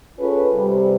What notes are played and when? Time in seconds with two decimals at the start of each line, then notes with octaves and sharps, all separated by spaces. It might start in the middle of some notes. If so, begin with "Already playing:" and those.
0.19 C#4 F4 G#4 A4 B4
0.53 C3 G3